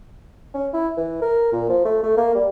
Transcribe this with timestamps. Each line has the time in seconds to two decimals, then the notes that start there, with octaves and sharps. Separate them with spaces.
0.54 C#4
0.73 E4
0.97 E3
1.22 A#4
1.52 A#2
1.69 F3
1.85 A3
2.03 A3
2.17 A#3
2.35 G3